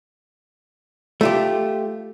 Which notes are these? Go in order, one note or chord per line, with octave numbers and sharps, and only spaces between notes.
A3 F4 G4